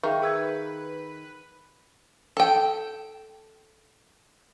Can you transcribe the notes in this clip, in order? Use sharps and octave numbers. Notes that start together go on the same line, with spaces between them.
D#3 G#4 E5 F5 G5 C#6
G#4 B4 E6 G#6
A4 G5